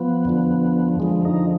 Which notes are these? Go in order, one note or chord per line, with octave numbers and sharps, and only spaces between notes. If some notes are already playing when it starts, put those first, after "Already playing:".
Already playing: F3 B3
F2 D3 F3
F2 D3 F3 G#3
D#4